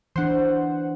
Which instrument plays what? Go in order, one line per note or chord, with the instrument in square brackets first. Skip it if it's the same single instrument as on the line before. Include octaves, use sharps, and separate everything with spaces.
[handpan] E3 D4 [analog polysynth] C5 F#5